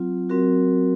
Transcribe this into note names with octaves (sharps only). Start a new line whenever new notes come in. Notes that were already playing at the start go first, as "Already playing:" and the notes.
Already playing: F#3 C4 F4
F#3 C4 F#4 A#4